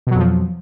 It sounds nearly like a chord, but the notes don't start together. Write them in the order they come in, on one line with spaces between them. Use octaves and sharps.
B2 F#3 F2 F3